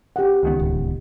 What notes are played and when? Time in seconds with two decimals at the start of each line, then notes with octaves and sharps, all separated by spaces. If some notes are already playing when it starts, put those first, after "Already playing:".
0.16 G4 F#5
0.43 C#2 D#3 B3
0.59 D1